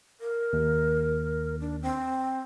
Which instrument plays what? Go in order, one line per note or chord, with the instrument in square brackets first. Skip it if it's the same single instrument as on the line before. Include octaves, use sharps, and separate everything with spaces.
[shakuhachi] A#4
[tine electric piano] D#2
[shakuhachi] D4
C4